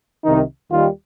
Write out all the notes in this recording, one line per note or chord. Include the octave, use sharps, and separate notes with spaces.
C2 C3 D#3 D#4
D#2 D#3 G3 F4